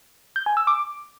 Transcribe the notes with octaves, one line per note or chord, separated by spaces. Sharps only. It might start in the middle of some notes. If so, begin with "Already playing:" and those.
G6
G#5
E6
D6